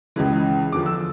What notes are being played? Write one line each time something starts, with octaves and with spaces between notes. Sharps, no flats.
C#2 C#3 E3
E2 D3 F3 D6
E6